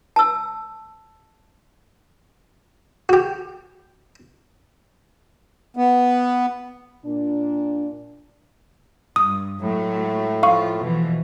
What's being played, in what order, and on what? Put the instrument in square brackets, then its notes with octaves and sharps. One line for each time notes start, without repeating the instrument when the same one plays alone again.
[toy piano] A5 E6
[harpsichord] F#4 G4
[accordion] B3
[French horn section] A#2 D4
[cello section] G2 [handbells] D#6
[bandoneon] A2 [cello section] F#3 G#3 A3
[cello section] F3 A3 F4 [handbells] F5 C#6
[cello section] B2 E3 F3